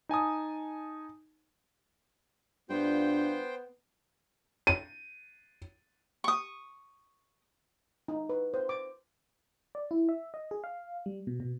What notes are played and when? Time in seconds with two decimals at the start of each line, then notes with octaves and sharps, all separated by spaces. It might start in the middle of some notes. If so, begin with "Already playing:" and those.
0.09 D#4 G#5 A5 D#6
2.70 G2 B3 D4 F4 C5 G5
4.67 D#7
6.24 C#6 D#6
8.08 D#4
8.29 B4
8.54 C5
8.69 D6
9.75 D5
9.91 E4
10.09 E5
10.34 D#5
10.51 G#4
10.64 F5
11.06 G3
11.27 B2
11.40 B2